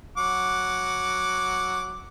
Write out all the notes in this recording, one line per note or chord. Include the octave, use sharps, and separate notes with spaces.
F#3 F#5 D6